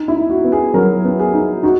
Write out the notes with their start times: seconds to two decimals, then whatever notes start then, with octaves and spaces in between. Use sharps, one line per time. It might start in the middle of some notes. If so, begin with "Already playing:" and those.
Already playing: D#4
0.08 E4
0.16 D#4
0.29 F#4
0.44 B3
0.52 G#4
0.74 F#3 A#4
1.04 B3
1.20 G#4
1.33 D#4
1.63 D#4 F#4